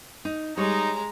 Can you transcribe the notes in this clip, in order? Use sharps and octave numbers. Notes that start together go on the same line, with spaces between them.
D#4
G3 G#3 D#4 C#5 A#5